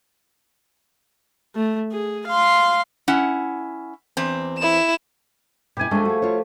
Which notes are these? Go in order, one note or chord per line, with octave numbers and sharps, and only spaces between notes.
A3
G#4
F5 C6
C#4 E4 F#5
E2 C4
E4 E7
B2 E4 G4 G#5
F3 G#3 A3 D4
F#4 G#4
F4 F#4 C#5